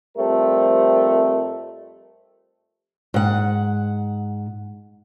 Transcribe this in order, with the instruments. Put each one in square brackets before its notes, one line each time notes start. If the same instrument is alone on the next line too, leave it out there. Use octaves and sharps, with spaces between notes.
[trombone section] F2 G3 A3 C4 A#4
[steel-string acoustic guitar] G#2 F#5